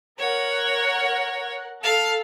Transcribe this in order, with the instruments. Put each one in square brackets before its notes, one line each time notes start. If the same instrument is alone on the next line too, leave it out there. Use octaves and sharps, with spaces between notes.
[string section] A#4 F#5 [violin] C#5
[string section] A4 [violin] F5